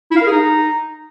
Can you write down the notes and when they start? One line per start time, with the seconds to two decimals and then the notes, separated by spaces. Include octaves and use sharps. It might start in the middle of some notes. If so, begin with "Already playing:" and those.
0.11 E4
0.16 F5
0.21 A#4
0.26 G#4
0.31 D#4